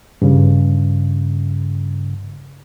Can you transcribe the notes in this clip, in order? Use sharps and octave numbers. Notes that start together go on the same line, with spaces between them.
G2 C#3